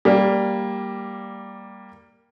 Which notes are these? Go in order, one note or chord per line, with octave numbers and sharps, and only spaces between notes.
G3 A#3